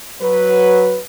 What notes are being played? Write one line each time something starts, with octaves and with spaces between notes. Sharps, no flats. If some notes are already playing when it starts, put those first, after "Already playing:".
F#3 B4